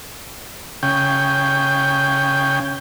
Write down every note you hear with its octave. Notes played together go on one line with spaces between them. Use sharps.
C#3 G5